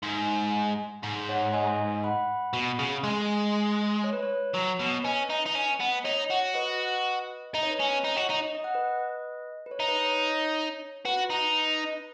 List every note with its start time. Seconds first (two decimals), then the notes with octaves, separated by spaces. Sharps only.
0.03 G#2
1.03 G#2
1.29 C#5 F#5
1.53 D#5 G#5
2.04 F#5 B5
2.53 B2
2.79 C#3
3.03 G#3 D#5 G#5
4.04 C#5
4.13 B4
4.23 C#5
4.54 F#3
4.79 B2
5.04 C#4 B4 D#5
5.30 D#4
5.46 D#4
5.55 C#4
5.80 B3
6.04 D#4 C#5
6.30 F#4
6.54 B4 D#5
7.54 D#4 D#5
7.63 C#5
7.71 B4
7.77 C#4 C#5
8.05 D#4
8.17 F#4
8.30 D#4
8.55 D#5
8.64 F#5
8.74 B4 D#5
9.66 B4
9.71 C#5
9.80 D#4
9.88 B4
10.05 C#5
11.05 F#4 B4
11.30 D#4